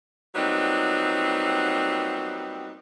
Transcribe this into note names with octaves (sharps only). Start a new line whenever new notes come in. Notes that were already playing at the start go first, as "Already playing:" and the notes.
A#2 F#3 G3 B3 C4 D#4